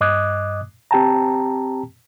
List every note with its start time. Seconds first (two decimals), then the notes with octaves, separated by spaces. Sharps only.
0.01 G2 D#5 D6 D#6 F#6 G#6
0.91 C4 G4 G5 A5 A#5